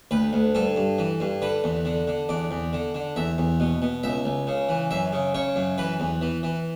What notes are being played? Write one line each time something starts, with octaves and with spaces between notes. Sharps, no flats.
D2 B4
D2
G2 A4
G2
E3
G2
D3 B4
E2
D3
D3
E2 D5
E2
D3
D3
E2 E5
E2
B2
B2
C#2 E5
C#2
C#3
E3
F#2 E5
C#3
C#3 C#5
F#2
E3 B4
E2
E3
E3